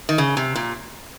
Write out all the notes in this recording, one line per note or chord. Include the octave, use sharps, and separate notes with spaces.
D#3
C#3
C3
A#2